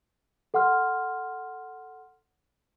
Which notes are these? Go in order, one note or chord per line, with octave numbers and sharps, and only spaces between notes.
A4 F#5 C6 F6